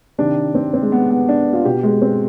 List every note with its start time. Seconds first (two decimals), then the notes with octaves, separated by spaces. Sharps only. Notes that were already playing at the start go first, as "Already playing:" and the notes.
0.18 C3 D#3 D4
0.55 C4
0.73 C4
0.82 G#3
0.92 B3
1.10 B3
1.29 D4
1.53 F4
1.65 B2 G4
1.83 G#3
2.02 C4